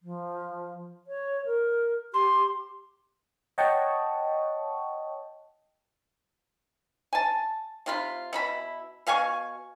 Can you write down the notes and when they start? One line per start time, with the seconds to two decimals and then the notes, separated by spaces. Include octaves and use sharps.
0.02 F3
1.07 C#5
1.46 A#4
2.14 G4 C6
3.58 C#5 D#5 F#5 G5 A5 C#6
7.13 G#5 A5
7.86 C3 F4 B5
8.33 B2 E4 B5
9.07 B2 F5 G#5 C#6